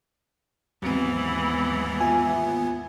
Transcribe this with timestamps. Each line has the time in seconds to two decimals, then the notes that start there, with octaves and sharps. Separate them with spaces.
0.82 D#2 G#2 E3 F#3 B3 C4
2.01 F4 E5 G#5